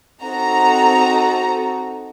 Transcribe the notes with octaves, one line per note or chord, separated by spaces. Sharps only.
C4 D#4 F#4 A4 A#5